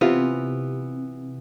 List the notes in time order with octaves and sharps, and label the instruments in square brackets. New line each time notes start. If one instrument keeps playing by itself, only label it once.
[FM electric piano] C3 [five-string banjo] E3 B3 F4